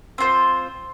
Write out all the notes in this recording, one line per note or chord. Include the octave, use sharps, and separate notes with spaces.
C4 F4 C5